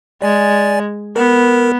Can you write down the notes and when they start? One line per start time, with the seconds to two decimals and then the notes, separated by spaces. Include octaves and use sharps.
0.22 G#3 D5 G#5 A6
1.16 B3 A#4